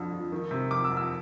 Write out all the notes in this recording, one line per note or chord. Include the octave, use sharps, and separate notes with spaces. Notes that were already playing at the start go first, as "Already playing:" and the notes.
Already playing: F2 D3 F3
F2
D#3
C3
F2 D6
E6
F2
E6